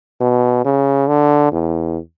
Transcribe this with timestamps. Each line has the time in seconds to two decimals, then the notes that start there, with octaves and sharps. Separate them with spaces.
0.20 B2
0.65 C#3
1.08 D3
1.52 E2